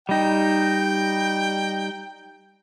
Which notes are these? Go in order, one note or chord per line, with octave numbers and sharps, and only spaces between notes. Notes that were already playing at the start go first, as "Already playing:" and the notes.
G3 D#4 G5